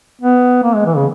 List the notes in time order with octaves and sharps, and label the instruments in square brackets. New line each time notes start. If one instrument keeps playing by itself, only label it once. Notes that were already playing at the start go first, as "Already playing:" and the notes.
[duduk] B3
A#3
G#3
E3
C#3